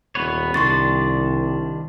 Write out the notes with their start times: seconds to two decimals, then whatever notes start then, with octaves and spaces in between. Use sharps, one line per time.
0.15 D#1 B3 B4 C#5
0.54 C2 D#3 G3 D4 C6 C#6 A6